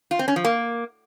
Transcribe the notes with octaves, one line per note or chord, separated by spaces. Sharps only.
F4
C4
C#4
F3
A#3